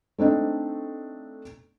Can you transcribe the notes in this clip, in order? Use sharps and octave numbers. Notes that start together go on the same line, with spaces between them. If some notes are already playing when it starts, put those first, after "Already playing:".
A3 C4 D4 D#4